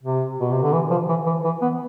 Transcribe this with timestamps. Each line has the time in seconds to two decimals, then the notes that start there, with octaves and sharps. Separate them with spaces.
0.03 C3
0.40 B2
0.51 C3
0.63 D3
0.73 E3
0.91 F3
1.09 E3
1.26 E3
1.45 E3
1.62 B3